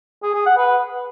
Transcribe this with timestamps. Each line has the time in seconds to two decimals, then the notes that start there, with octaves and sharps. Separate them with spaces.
0.23 G#4
0.34 G#4
0.46 F#5
0.57 B4